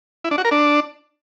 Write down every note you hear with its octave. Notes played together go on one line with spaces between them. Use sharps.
E4
D4
F#4
A#4
D4